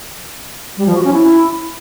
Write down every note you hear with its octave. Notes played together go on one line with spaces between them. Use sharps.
G3
F3
F#4
C#4
E4